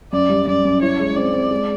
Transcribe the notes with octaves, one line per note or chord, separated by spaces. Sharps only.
F#2 D5
G3
F#2 D5
F#2
E4 C#5
G#3
C4 D5
C4
G#3